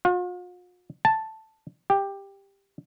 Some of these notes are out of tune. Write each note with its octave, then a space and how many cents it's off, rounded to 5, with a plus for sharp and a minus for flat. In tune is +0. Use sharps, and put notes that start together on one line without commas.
F4 +45
A5 +0
G4 +10